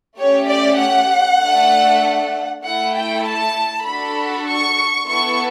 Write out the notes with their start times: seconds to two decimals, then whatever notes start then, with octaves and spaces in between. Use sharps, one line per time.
0.19 A3 C#4 G4 C#5
0.51 D5
0.81 F#5
1.41 A3 D4 A4
2.63 A3 E4 A4 F#5
2.94 G5
3.25 A5
3.86 D4 F#4 A4 B5
4.47 C#6
5.07 B3 E4 A4 C#6